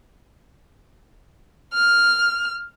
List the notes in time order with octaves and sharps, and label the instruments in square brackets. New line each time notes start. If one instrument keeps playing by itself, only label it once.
[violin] F6